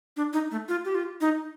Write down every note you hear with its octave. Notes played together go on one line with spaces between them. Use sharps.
D4
D#4
A3
F4
G4
F4
D#4